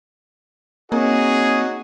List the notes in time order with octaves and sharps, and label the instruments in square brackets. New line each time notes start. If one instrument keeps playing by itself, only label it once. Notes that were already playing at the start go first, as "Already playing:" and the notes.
[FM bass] A#3 [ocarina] C4 [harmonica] C#4 D#4 F#4 [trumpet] G#4